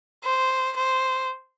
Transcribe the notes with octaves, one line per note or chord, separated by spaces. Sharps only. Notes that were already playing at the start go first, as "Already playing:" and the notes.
C5
C5